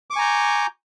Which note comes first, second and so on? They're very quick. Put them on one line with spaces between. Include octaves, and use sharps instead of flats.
D6 C#6 G#5 A#5 G6